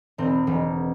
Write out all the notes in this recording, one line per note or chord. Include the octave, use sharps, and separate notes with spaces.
E1 C4
E1